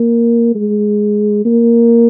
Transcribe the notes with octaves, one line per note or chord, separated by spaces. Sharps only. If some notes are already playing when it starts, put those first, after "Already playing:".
Already playing: A#3
G#3
A#3